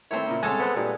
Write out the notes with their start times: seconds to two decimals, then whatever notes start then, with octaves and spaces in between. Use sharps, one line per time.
0.11 D#3 A3 C4 E4 C5 C#5
0.26 A#2 C#3 A#3
0.43 C2 G#3 A4 C#5 G#5
0.59 B3 C5 A5
0.76 G2 A#2